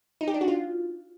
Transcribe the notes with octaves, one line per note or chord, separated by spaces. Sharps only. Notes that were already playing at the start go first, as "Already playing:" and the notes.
D#4
G4
D4
F#4
F4